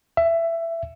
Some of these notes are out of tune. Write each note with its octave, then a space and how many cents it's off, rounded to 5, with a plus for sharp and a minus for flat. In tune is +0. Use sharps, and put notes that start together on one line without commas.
E5 +15